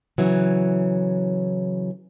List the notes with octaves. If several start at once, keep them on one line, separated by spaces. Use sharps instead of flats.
C#3 E3 F#3